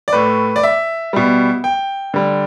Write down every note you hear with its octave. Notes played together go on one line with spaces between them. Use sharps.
D5
A2 A3 B4
D5
E5
B2 G3
G5
D3 G3